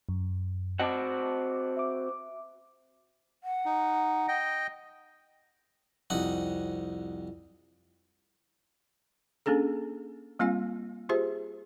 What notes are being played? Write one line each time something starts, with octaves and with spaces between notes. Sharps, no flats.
F#2
C4 F#4 D#5 F#5 A5 D6
E5 D6
F#5
D#4
D#5 G5
C2 F2 D#4 F#5
A#3 C#4 D4 G#4 A4
G3 A#3 C4 F4 F5 G#5
F4 G4 G#4 C5 E5